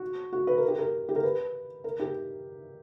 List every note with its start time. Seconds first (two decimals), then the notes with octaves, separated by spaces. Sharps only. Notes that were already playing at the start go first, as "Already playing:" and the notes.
Already playing: F#4
0.33 F#4
0.47 B4
0.58 A#4
0.68 G4
0.79 A#4
1.09 G4
1.16 A#4
1.23 B4
1.84 A#4
2.00 G4